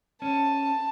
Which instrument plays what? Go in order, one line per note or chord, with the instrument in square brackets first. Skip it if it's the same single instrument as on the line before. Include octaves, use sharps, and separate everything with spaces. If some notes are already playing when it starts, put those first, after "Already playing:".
[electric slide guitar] C#4 [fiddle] A5